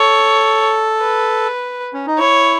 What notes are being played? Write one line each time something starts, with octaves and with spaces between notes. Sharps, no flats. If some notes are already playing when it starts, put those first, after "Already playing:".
Already playing: A4 C#5
B4
C#4
D#4
E4 C#5